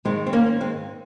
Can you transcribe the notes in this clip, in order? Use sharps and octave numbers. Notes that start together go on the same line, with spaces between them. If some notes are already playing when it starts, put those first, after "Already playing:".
G#2 D#3 G#3 C4
C4
A#3 C#4
G#3 C4